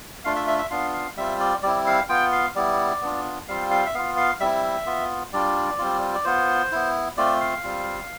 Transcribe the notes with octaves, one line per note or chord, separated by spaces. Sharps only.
A3 D4 F4 F5
E5
E5
E5
B3 D4 F4 F5
F5
G3 C4 F4 E5
D5
G3 C4 E4 D5
F5
B3 F4 G5
F5
G3 B3 E4 D5
B3 D4 F4
G3 C4 F4 F5
F5
E5
B3 F4 F5
F5
G3 C4 E4 E5
B3 F4
G3 D4 F4 D5
G3 C4 F4
D5
B3 F4 C5
B3 E4
A3 C4 F4 D5
F5
G3 C4 F4